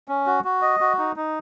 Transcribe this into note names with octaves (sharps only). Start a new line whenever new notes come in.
C#4
F#4
F#4
D#5
F#4
D#4
D#4